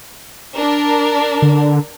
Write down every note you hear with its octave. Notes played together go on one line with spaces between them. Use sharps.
D4 A#4
D3